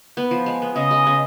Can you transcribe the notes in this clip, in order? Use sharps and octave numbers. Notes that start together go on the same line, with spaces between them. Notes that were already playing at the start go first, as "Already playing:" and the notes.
B3
F3
G#3
B3
C#3 D#5
G#3
C#3